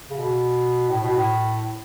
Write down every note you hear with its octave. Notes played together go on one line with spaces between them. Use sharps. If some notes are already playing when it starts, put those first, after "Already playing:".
C#3
B2
A2
B2
A2